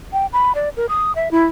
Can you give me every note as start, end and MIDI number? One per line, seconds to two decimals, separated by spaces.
0.13 0.26 79
0.33 0.52 83
0.55 0.69 74
0.77 0.86 70
0.89 1.12 87
1.15 1.31 76
1.31 1.45 64